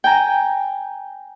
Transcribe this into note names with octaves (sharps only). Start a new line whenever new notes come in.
G5 G#5 A#5